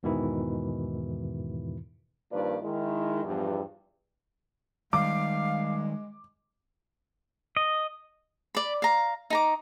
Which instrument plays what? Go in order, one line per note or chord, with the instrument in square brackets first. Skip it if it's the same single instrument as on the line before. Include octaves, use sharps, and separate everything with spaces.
[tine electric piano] E2 G#2 B2 D#3 E3 E4
[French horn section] G2 D#3 F3 A#3 B4 D5
D#3 G#3 E4
E2 G2 F3
[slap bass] D#3 G3 [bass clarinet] G#3 [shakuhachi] F5 [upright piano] D6
[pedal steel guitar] D#5
[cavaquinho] D5 B5
F5 A#5
D#4 A#5 D6